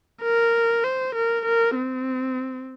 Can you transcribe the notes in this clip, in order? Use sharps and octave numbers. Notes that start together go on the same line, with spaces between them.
A#4
C5
A#4
A#4
C4